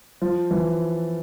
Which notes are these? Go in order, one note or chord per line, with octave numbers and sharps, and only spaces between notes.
F3
E3